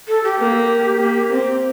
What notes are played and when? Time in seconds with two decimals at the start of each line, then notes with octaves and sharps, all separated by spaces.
0.08 A4
0.24 G4
0.38 A#3
1.00 A#3
1.32 C4